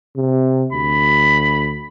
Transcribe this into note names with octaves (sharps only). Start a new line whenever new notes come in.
C3
D2 B5